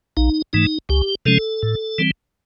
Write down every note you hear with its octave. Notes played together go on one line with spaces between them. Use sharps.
A#1 D#4
G#2 E3 A3 D#4
C#2 G4
C3 F3 G#3 C#4 A4
A2
E3 G3 C4